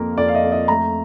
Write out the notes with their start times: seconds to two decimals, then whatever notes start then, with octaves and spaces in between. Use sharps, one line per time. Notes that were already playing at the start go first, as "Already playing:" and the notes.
Already playing: F2 A#3 A#4
0.18 F2 D5
0.28 F5
0.35 D#5
0.43 F2
0.52 D#5
0.68 A3 A#5